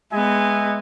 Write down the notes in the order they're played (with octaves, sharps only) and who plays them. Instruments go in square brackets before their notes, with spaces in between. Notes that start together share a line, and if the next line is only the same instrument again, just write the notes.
[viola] G#3 B3 [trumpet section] D#5 E5 G#5